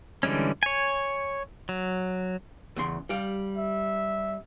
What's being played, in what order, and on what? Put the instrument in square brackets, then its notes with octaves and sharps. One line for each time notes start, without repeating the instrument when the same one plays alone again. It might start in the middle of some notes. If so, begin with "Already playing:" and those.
[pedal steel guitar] D3 E3 G3 G#3 C#4
C#5 G#5
F#3
[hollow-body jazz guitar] E2 C#3 C6
G3 G4 F5
[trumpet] E5